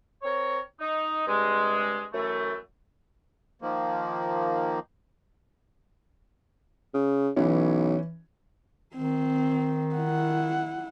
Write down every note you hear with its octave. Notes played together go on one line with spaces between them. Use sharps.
C4 A#4 C#5
D#4
G2 C3 G#3
F#2 E3 A3
D#3 F3 A#3
C#3
B1 E3 C#4
D#3 C4
E4 F#5